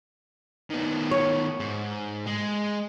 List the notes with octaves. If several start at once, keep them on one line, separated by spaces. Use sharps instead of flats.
D#3 B3
C#5
G#2
G#3